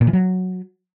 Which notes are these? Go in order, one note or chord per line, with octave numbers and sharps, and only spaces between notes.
A#2
E3
F#3